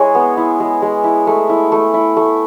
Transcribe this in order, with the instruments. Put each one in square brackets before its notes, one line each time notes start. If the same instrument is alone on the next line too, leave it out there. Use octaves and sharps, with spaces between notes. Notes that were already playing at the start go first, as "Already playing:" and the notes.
Already playing: [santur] G#3 E4 G#4 C#5
B3
E4
G#3
G#3
E4
A3
E4
A3
E4
A3